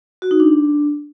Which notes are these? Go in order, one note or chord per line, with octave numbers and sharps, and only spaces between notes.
F#4
D#4
D4